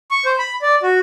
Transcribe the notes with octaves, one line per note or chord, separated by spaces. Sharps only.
C#6
C5
B5
D5
F#4